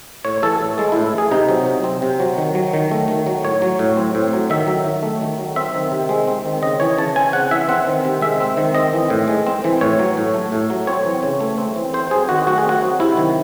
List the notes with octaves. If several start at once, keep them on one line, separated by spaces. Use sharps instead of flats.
A2 C#5
E3 A4
A2
G#3 A4
A2 E4
E3
G#4
C3 D#4
F#3
C3
C4
C3
F#3
D#3
F#3
D#3
A3
D#3
F#3
A2 C#5
F#3
A2
C4
A2
F#3
D#3 E5
F#3
D#3
A3
D#3
F#3
C4 E5
D#3
C3
G#3
C4
D#3
C#3 D#5
E3 C#5
C#3 A5
C4 G#5
C#3 F#5
E3 E5
C4 F#5
D#3
C3
G#3 E5
C4
D#3
C4 D#5
E3
A2
G#3
C4
E3
A2 C#5
F#3
A2
A3
A2
F#3
C4 C#5
E3
C#3
A3
C4
E3
C4 C5
F#3 G#4
D#3 F#4
A3 F#4
G#4
C4 F#4
F#3
C3 E4
D#3